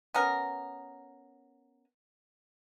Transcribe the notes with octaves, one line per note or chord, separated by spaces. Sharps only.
B3 C#4 A#4